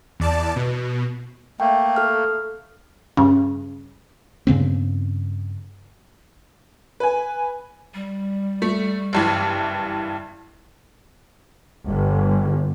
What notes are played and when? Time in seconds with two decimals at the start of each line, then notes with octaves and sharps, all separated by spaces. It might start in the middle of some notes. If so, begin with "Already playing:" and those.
0.20 E2 D5 A5
0.56 B2
1.60 A3 A#3 G5
1.96 A4 F6
3.17 G2 C#3
4.47 G2 C#3 B3 C4
7.00 B4 G#5
7.94 G3
8.62 A3
9.13 F#1 G2 E3
11.85 G1